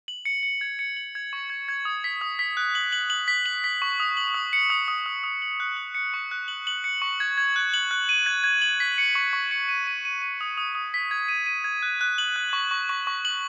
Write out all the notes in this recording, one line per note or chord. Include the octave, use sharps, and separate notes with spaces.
F#7
C#7
C#7
G#6
C#7
F#7
G#6
C#6
G#6
G#6
D#6
B6
D#6
B6
F#6
F#7
F#7
F#7
B6
F#7
B6
C#6
D#6
F#7
D#6
C#7
D#6
D#6
D#6
D#6
F#7
F#6
F#7
C#7
C#6
F#6
F#7
F#7
C#7
C#6
G#6
G#6
F#6
F#7
F#6
D#7
G#6
G#6
F#7
B6
C#7
C#6
C#6
C#7
D#7
D#7
D#7
D#7
D#6
D#6
D#6
B6
G#6
D#7
D#7
G#6
F#6
F#6
F#7
F#6
C#6
C#6
C#6
C#6
F#7